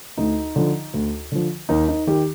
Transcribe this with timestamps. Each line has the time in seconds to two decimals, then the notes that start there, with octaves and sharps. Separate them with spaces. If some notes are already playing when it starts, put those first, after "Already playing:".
0.18 D2 D#4
0.56 D3 F3
0.94 D2
1.32 D3 F3
1.69 D#2 D#4
1.88 D#4
2.07 D#3 G4